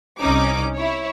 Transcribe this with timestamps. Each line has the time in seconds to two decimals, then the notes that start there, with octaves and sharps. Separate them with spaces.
0.19 C2 C#4 D#4 D6
0.74 E4 C#5